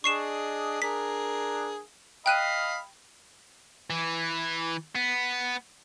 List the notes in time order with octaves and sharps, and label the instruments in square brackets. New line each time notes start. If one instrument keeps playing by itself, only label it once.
[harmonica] D4 G#4 D#5 [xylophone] C#6 C7 E7
[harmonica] D4 G#4 A#4 [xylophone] B6
[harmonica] D#5 F5 B5 [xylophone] G5 F#6 D#7
[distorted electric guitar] E3
B3